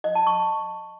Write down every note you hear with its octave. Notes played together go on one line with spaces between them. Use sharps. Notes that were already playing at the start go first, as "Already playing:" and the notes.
D#5
A5
C#6